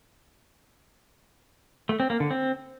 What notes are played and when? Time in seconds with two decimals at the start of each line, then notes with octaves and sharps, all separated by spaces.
1.89 A3
2.00 C4
2.10 A#3
2.20 D3
2.31 C4